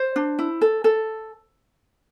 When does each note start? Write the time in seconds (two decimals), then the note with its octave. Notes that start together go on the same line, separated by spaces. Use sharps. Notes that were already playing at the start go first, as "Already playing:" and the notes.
Already playing: C5
0.16 D4
0.39 E4
0.61 A4
0.84 A4